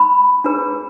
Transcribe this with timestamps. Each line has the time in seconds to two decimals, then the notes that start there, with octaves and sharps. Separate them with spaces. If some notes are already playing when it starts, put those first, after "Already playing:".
Already playing: B5
0.44 D4 G#4 B4